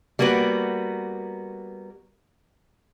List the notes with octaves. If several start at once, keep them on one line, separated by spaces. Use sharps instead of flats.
G3 A#3 B3 F#4 B4